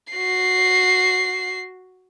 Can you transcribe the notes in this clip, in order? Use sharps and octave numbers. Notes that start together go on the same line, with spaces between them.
F#4 C7